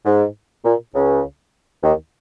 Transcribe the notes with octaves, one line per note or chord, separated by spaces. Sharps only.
G#2
A#2
C#2 C#3
D#2 D#3